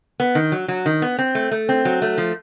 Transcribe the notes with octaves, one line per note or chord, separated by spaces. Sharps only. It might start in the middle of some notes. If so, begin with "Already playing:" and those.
B3
D#3
F#3
F#3
D#3
B3
C4
A3
A3
C4
F#3
A3
F3